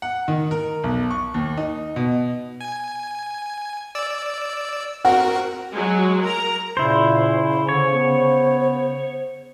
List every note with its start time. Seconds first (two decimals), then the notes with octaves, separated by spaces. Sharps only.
0.02 F#5
0.28 D#3
0.51 A#4
0.84 B1
1.11 C#6
1.34 D#2
1.57 D#4
1.96 B2
2.61 G#5
3.95 D5 E6
5.05 C4 F#4 A#4 F#5
5.72 F#3 G#3
6.25 A#4 A#5
6.77 A#2 C#3 E4 C5
7.69 D3 C5 C#5
7.90 B3